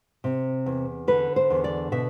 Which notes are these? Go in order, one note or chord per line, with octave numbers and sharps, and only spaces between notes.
C3
E2
D3 B4
C5
E2
D5
B2 E5